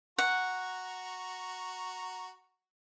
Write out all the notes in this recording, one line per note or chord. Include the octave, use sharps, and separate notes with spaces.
F#4 F#5 A#5 C#6